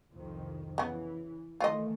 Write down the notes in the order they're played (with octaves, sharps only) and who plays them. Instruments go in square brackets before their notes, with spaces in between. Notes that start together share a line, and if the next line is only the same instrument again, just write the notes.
[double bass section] C2 F2 D#3
[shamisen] C#3 B3 [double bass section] E3
[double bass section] D#3 E3 A3 [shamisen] F4 D5 D#5